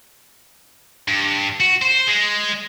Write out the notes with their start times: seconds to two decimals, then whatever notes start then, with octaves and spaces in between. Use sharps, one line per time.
1.08 G2
1.60 F#4
1.81 C5
2.08 G#3